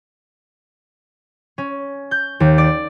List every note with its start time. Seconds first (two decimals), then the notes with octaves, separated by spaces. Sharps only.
1.58 C#4
2.11 G6
2.40 D#2
2.58 D5